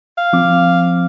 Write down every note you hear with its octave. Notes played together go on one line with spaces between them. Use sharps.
F5
F3 C4 D6